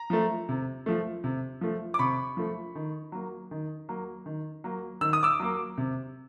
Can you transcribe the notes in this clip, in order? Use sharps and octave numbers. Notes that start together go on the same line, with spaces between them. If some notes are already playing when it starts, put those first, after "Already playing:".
Already playing: A#5
F3 A3
C3
F3 A3
C3
F3 A3
D6
C3 B5 C#6
F3 A3
D#3
F#3 A#3
D#3
F#3 A#3
D#3
F#3 A#3
D#3 E6
D#6
D6 E6
F#3 A#3
C3